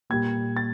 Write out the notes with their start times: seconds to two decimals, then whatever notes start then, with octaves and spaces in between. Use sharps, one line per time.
0.10 A#2 G3 A#3 G#6
0.57 A6